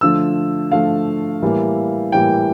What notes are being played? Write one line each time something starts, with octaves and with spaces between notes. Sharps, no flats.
D3 F3 A3 E6
D3 F3 A3 F5
A2 E3 G3 A#3
A2 E3 G3 A#3 G5